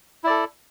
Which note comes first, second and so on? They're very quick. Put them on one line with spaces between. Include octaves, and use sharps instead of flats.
E4 D5 A4